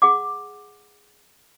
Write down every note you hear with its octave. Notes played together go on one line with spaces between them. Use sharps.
G#4 F#5 D6